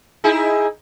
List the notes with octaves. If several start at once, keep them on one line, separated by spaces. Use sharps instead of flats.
D#4 E4 G#4